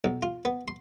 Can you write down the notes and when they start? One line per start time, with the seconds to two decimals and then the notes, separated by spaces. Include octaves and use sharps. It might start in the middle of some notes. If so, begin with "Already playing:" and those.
0.04 B1
0.23 F4
0.45 B3
0.68 C6